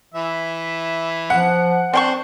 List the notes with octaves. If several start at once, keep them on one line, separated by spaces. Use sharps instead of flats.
E3 E5
F3 F#5
C4 D4 C5 G5 C#6